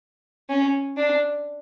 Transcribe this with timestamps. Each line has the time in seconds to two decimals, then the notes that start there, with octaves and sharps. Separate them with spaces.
0.49 C#4
0.97 D4